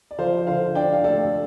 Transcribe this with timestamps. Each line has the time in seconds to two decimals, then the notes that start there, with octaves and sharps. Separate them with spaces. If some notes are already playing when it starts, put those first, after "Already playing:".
0.11 D5
0.18 F3 C5 F5
0.47 D3 C5 F5
0.75 D4 D5 G5
0.93 F5
1.04 A3 A4 D5